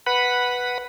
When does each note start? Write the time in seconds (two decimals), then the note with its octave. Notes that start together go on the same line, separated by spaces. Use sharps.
0.07 B4 F#5 B5